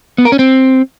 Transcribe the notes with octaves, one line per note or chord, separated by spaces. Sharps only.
B3
A#4
C#4
C4